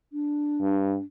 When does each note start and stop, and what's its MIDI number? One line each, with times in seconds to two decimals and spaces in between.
0.13 1.03 62
0.61 0.95 43